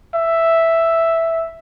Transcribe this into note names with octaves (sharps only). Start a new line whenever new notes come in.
E5